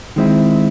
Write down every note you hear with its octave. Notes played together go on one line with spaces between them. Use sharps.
D#3 G#3 C4 E4